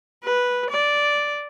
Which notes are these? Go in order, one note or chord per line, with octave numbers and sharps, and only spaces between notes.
B4
D5